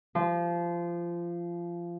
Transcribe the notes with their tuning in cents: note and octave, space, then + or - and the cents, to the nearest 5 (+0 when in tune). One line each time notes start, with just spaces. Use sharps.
F3 -20